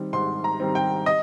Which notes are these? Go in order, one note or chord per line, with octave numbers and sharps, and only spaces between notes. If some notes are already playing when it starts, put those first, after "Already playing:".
Already playing: D#3 G3 C4
G#2 C6
A#5
D#3 G3 C4
G5
D#5